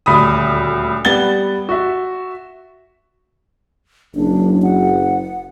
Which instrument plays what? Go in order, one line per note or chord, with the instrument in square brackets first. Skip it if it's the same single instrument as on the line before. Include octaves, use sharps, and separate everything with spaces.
[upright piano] D#1 D2 B5 D#6
G3 B3 F#5 A6 G7
F#4 E5
[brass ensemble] F#1 [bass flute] D4
[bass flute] F#5